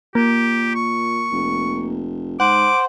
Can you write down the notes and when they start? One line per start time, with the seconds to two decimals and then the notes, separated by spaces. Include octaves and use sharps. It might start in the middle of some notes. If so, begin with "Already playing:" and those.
0.15 A#2 A#3 G4
0.75 C#6
1.32 F1
2.40 G#2 C5 F#5 D6